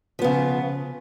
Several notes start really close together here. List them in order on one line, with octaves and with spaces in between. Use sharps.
F3 B3 C#3